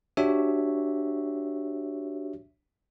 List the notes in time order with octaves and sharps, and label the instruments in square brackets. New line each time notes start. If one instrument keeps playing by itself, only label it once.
[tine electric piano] D4 F#4 G4 C#5 E5